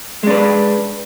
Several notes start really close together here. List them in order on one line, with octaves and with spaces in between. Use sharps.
G#3 D4 B4